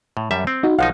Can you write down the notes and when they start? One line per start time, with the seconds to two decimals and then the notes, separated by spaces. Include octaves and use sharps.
0.17 A2
0.31 F#2 G3 E5
0.47 C4
0.63 D#4 F#4
0.79 B1 F3 D#4 F5 F#5